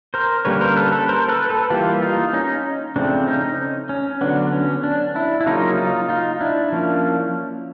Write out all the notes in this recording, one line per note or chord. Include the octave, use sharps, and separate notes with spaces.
A#4 C5
D3 G3 A#3 C#4 B4 C#5
A#4 C5
A4 B4
A4 B4
A#4 C5
A4 B4
A4 B4
E3 G3 A#3 F4 G4
D#4 F4
C#4 D#4
C#3 F3 A3 C4 D4
C#4 D#4
C#4
D3 F#3 B3 D4
C#4
D4
D4 E4
E4
C#3 F#3 A#3 C#4 D#4 F4
D#4 F4
D#4 F4
D4 E4
F3 A#3 C#4